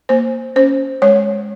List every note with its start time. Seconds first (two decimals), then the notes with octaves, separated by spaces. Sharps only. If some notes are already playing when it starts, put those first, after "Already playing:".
0.09 A#3 C5
0.56 C#4 C5
1.02 G#3 C#5